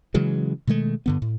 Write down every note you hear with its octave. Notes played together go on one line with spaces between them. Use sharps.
C#3 E3 F#3 G#3
B2 D#3 G#3 A3
G2 D3 B3
A2